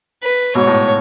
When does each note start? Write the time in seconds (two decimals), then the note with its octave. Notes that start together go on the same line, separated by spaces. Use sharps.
0.23 B4
0.55 G#2 B2 C#5
0.67 A2